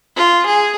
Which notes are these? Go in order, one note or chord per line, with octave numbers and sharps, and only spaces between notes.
F4
G#4